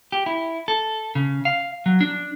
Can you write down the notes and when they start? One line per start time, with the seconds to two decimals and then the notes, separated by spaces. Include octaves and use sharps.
0.12 G4
0.26 E4
0.68 A4
1.15 C#3
1.45 F5
1.86 F#3
2.01 D4